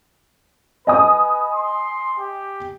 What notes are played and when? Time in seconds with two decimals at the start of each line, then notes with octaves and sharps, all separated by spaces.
0.87 B4 D#5 G#5 D#6
1.53 C6
2.19 G4